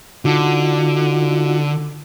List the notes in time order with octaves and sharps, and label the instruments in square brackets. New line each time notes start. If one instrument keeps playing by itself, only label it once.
[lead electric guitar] D3 [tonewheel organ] D#4 F4 F#4